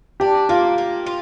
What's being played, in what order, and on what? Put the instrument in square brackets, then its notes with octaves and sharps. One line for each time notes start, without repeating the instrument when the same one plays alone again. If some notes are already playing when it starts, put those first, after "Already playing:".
[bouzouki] D4 [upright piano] G4
[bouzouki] A#3 [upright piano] F4
[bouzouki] A#3
F4